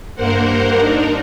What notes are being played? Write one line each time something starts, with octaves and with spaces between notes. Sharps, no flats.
G2 A#3 A#4 C5 F#5
D4 D#4 A#4